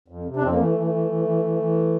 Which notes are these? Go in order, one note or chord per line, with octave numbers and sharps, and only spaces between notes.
F2
C3
D4
F2 C4
A#3
E3 A3
E3
A3
E3
E3
E3
E3
E3